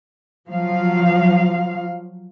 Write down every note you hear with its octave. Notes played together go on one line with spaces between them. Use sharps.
F3 F#3 F5